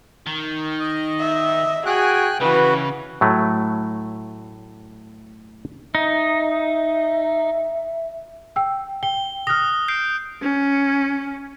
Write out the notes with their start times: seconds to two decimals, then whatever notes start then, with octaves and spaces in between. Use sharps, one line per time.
0.26 D#3
0.79 D#5
1.20 E5
1.86 F#4 G#4 G5 G#5 F#6
2.41 C#3 E3 F#4 B4
3.21 A2 F#3 A3
5.95 D#4 E5
8.56 G5 E6
9.03 G5 G7
9.47 D#6 F6 F#6 A#6
9.88 G6 C7 D7
10.42 C#4